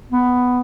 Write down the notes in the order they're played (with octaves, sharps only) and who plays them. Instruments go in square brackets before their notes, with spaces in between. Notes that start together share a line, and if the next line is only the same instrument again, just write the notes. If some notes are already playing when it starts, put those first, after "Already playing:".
[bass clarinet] B3